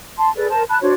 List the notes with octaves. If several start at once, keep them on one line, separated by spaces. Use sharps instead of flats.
A5 C6
G#4 A4 B4 D5
A#4 C5 A5
A5 B5 F#6
D4 F#4 C5 C#5